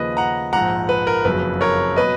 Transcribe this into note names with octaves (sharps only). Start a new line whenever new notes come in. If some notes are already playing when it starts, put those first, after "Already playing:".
Already playing: D#2 C#3 F3 B4 D#5
F#5 A#5
A#1 G#2 F3 F#5 A#5
B4
A#4
F#1 F2 C#3 F#3 B4
A#4 C#5
B2 F#3 B4 D#5